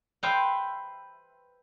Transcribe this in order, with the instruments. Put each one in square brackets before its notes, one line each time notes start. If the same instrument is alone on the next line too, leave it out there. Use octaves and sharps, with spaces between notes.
[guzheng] B4 C5 E5 F5 G5 A#5